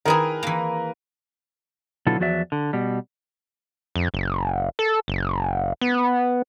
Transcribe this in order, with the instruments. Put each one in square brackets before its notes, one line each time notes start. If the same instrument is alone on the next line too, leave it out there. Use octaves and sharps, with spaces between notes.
[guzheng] D#3 E4 G#4 [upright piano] A#4 B4 A#5
[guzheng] E3 A#3
[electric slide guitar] B2 D3 F#3 E4 F4 A4
E2 F3 F#3 F#4 D5 E5
D3
B2 G3
[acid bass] F2
F#1
A4
F#1
B3